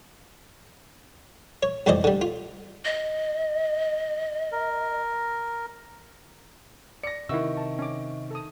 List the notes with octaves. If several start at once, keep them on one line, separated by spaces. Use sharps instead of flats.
C#5
C2 F2 E3 C5 D5 D#5
D3 G3
F4
D#5
A#4
D5 A#6 C#7
C3 D#3 E4 D#5 E5 F#5 C#6 E6
A5
C#4 D6
A4 A5 D#6